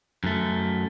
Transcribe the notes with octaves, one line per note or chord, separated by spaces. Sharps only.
F#2 A3